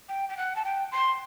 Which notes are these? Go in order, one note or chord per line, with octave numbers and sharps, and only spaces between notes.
G5
G5
F#5
A5
G5
C6